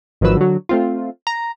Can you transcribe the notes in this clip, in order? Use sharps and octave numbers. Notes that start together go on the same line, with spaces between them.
G#1 D#3 F3 F#3 B4 E6
D3 F#3
A3 C4 F4
A#5